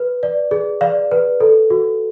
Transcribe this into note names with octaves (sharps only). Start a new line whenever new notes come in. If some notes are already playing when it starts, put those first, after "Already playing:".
Already playing: B4
D5
G#4
D5 F5
B4
A4
F#4